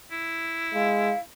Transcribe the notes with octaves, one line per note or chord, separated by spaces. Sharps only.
E4
G#3 F5